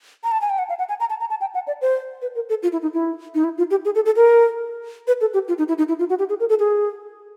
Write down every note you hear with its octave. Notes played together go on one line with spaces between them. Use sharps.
A#5
A5
G#5
G5
F#5
F5
F#5
G#5
A#5
A5
A#5
A5
G5
F#5
D5
C5
B4
A#4
A4
F4
E4
D#4
E4
D#4
E4
F4
G4
G#4
A4
A4
A#4
B4
A4
G4
F4
D#4
E4
D#4
E4
F4
F#4
G4
G#4
A#4
A4
G#4